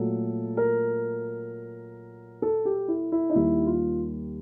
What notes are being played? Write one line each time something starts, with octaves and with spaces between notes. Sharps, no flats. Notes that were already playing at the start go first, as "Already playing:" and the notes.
Already playing: A#2 F#3 A3 A4
A#4
A4
G4
E4
E4
D#4
D#2 D#3 G3 E4
F4